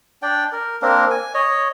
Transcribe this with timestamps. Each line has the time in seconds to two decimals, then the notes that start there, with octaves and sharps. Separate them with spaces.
0.22 D4 D5 G5
0.52 A#4
0.82 A#3 C4 D4 A#4
1.11 G#5
1.34 C#5 D#5